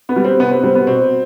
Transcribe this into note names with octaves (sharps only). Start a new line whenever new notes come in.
B3
G3
C4
C3 B3
C4
G3 C4
B3
B2 C4